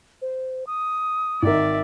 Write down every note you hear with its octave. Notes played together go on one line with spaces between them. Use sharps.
C5
D#6
G#1 D#3 A#4 D5 E5